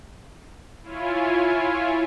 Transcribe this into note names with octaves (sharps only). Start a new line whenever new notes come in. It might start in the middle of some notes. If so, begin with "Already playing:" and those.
E4 F4 C#5 G#5